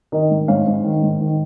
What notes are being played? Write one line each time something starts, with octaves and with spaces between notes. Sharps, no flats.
D#3 A#4 D#5
G#2
G#2 C#5 F5
G#2
D#3
G#2
D#3